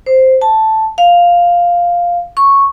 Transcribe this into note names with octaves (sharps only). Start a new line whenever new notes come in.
C5
A5
F5
C#6